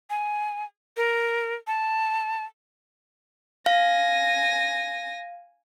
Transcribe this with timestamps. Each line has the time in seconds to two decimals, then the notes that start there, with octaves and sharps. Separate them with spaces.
0.10 G#5
0.97 A#4
1.67 A5
3.66 F5 G#5 A#6